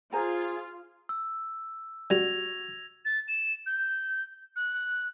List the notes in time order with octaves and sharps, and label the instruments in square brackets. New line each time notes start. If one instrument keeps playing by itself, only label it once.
[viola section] F4 [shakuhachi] G#4 [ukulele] C5 G#5 A#5
[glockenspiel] E6
[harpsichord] G3 [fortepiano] F#4 [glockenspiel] G#6 A#6 F7
[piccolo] A6
E7
G6
F#6